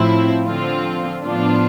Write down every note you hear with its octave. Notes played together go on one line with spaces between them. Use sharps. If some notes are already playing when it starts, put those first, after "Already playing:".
Already playing: A2 F3 C4 E4
D3 F3 C4 F4
A2 F3 B3 D4 F4